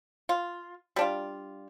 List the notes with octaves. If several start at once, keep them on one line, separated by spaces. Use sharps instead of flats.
F4
G3 D4 F4